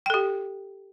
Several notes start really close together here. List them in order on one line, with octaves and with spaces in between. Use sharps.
G5 A4 G4